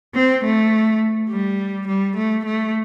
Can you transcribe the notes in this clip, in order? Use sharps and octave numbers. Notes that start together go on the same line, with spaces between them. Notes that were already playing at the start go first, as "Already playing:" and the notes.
C4
A3
G3
G3
A3
A3